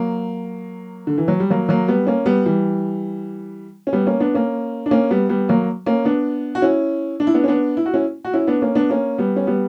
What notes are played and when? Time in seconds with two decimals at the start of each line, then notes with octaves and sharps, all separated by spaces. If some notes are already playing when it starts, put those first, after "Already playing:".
Already playing: F#3 A#3
1.07 D3
1.18 E3
1.28 F#3
1.40 G3
1.50 F#3 A#3
1.69 F#3 A#3
1.88 G3 B3
2.07 A#3 C#4
2.26 G3 B3
2.46 E3 G3
3.87 C#4
3.93 G3 B3
4.07 A#3 C#4
4.20 B3 D4
4.34 A#3 C#4
4.86 D4
4.91 A#3 C#4
5.11 G3 B3
5.29 G3 B3
5.49 F#3 A#3
5.86 A#3 C#4
6.05 B3 D4
6.55 F#4
6.62 C#4 E4
7.20 D4
7.27 E4
7.34 B3 D4
7.44 C#4
7.48 B3 D4
7.77 E4
7.86 F#4
7.94 C#4 E4
8.25 F#4
8.34 C#4 E4
8.47 B3 D4
8.62 A#3 C#4
8.75 B3 D4
8.90 A#3 C#4
9.18 G3 B3
9.36 C#4
9.47 G3 B3